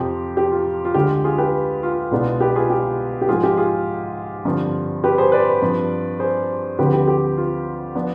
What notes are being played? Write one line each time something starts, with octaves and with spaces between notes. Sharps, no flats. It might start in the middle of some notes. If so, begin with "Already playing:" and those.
Already playing: F2 C3 F3 C4 G4
G4
F4
F4
D2 D3 G#3 G4
F4 G#4
G4 B4
F4
C2 B2 G#3 B3 D4
G4 B4
F4 G#4
G4
G4
G#2 F3 G#3 F4 G#4
G4
F4 G#4
G2 D3 F3 C4
G4 B4
G#4 C5
B4 D5
G2 F3 C4
G#4 C5
D2 D3 F3 C4 G4 B4
G4
G4
F4
F3 B3 D4